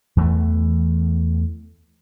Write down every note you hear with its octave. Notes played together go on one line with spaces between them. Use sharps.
E2 E3 G#3 A3